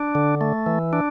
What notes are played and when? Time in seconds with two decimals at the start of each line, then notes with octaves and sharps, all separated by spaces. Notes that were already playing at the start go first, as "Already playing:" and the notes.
Already playing: D4
0.15 D3
0.41 A3
0.66 E3
0.93 D4